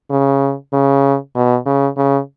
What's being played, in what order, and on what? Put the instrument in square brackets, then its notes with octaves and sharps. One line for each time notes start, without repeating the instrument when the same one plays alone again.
[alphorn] C#3
C#3
B2
C#3
C#3